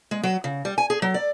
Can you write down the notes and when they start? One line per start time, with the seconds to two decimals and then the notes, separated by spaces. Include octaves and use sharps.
0.11 G#3
0.23 F#3
0.44 C#3
0.65 G3
0.78 G#5
0.90 G#4
1.02 F#3
1.14 D5